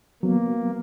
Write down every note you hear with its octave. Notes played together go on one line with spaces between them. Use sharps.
F#3 A#3 B3